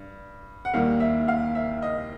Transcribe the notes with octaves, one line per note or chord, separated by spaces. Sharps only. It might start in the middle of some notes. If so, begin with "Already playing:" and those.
Already playing: G2
F#5
D#2 D#3 G3 A#3 F5
E5
F5
E5
D#5